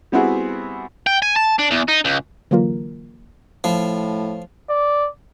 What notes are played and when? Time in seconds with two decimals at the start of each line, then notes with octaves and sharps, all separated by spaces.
0.12 G3 B3 C4 E4 F#4 G#4
1.07 G5
1.22 G#5
1.36 A5
1.59 D4
1.71 E2
1.88 D#4
2.05 C#2
2.51 D3 E3 F#3 A#3 F4 A#4
3.64 A2 F3
4.69 D5